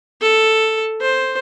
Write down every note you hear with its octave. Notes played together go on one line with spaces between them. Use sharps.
A4
C5